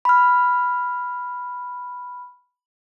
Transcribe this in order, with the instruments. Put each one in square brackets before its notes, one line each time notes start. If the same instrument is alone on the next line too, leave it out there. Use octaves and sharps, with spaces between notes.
[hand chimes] B5 F6